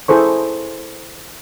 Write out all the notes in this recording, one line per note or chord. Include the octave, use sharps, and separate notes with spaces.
E4 G#4 A4 C5 C#6